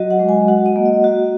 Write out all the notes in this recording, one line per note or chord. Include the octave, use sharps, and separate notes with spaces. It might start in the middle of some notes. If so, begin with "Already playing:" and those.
Already playing: F#3 F#4 D#5
F#5
G#3
G#5
F#4 F#5
D#5
A#3
D#5
F#4